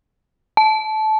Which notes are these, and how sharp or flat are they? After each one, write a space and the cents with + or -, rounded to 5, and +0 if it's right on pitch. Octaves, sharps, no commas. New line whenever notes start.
A5 -20